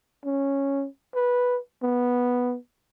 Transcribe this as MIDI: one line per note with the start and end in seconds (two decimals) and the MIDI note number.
0.25 0.86 61
1.15 1.58 71
1.83 2.56 59